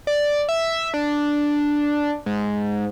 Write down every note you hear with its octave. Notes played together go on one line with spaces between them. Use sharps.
D5
E5
D4
G#2